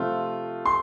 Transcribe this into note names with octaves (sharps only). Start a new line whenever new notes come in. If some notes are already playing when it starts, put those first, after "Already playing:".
Already playing: C3 F3 A3 C4 F4
C6